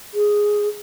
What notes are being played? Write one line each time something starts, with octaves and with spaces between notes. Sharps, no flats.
G#4